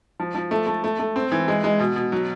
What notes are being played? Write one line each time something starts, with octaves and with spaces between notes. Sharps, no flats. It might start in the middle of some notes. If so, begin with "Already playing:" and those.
F3
F3
A3
A3
A3
A3
C4
E3
G#3
G#3
B2
B2
F#3